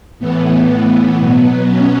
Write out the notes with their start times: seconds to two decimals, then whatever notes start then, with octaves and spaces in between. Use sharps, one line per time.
0.19 A2 E3 B3
1.19 B2 F#3
1.68 C#4